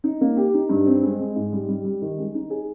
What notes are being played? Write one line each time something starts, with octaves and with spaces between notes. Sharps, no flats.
D#4
A#3
G4
D#4
G2
C4
G#3
G#3
G#2
G3
G3
G3
D#3
G#3
D#4
G#4